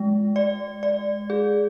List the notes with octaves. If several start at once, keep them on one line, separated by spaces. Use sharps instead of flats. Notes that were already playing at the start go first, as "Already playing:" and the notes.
Already playing: G#3
D5
D5
G#4